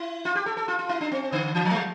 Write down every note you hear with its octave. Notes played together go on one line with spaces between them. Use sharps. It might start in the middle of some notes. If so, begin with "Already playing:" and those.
Already playing: E4
F4
G4
A4
A4
F4
F4
E4
D4
C4
D3
E3
F3
A3
G3